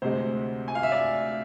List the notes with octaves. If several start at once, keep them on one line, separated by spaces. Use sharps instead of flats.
D2 C3 G#3 C5
G#5
F5
E5
D5